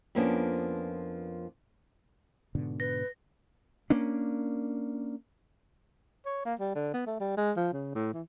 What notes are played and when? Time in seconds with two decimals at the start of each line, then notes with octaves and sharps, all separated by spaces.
0.15 F2 F3 A#3 B3 C#4 D4
2.55 G#2 B2 D3
2.80 B4 A#6
3.90 A#3 C#4 D4
6.26 C#5
6.45 A#3
6.59 G3
6.75 D3
6.94 B3
7.07 A3
7.20 G3
7.37 G#3
7.56 F3
7.73 C#3
7.95 A2
8.14 E3